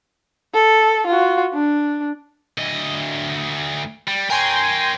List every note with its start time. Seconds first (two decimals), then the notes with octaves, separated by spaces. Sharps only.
0.54 A4
1.06 F4 F#4
1.54 D4
2.58 D2 D#5
4.08 G3
4.30 A#4 C#5 G5 G#5 C6